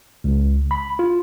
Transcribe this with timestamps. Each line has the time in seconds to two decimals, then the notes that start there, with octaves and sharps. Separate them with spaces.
0.24 C#2
0.71 B5
0.99 F4